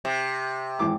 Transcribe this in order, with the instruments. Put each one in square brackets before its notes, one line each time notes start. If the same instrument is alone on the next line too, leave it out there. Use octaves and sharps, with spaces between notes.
[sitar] C3
[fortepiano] G#1 E3 D6